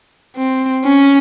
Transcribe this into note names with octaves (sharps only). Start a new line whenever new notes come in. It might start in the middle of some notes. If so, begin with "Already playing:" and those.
C4
C#4